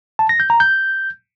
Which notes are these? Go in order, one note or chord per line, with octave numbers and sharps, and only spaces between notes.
A5
A#6
G6
A#5
G6